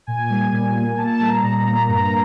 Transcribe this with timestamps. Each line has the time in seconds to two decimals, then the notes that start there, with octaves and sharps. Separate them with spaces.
0.07 A#2 G#5
0.30 G3
0.52 A#2
0.75 A#3
0.97 A#2 A5
1.20 G3
1.28 A#5
1.43 A#2
1.58 A#5
1.66 A#3
1.88 G2 A#5